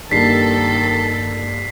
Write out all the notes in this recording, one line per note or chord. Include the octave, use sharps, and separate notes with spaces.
G2 D#3 A#3 A4 B6 C7